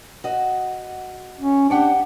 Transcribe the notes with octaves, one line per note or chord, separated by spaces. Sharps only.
F#4 D#5
C#4
D4 G4 F#5 G5